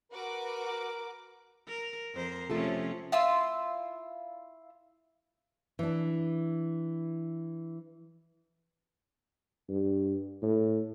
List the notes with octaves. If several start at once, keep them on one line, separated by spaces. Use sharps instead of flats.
F#4 A#4 B4 D6
A#4
F2 A#4 C5
C3 F3 A3 C#4 F4 A4
E4 F4 C6 E6
E3 D4
G2
A2